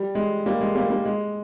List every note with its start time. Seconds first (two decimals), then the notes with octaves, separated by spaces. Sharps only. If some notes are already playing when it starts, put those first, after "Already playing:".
Already playing: G3
0.15 G#3
0.46 G3 A#3
0.61 G#3
0.75 G3 A#3
0.90 G3 A#3
1.05 G#3